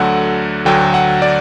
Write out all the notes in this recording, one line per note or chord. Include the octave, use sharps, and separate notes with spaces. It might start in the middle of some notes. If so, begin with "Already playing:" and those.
Already playing: D2 D3 F#3 A3 F#5
D2 D3 F#3 A3 G5
F#5
D5